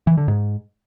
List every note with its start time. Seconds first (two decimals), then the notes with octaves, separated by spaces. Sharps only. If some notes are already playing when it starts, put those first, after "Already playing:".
0.07 E3
0.17 D3
0.28 G#2